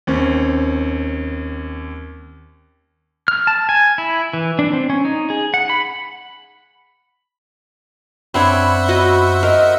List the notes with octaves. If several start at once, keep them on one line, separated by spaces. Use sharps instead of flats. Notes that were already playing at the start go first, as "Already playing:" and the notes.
D#2 C4 C#4
F6
A5
G#5
E4
E3
D4
C4
C#4
D#4
G#4
F#5
B5
F#2 C4 D4 C5 C#5 E5 F#5 B5
F#4 D#5
A#4 D#5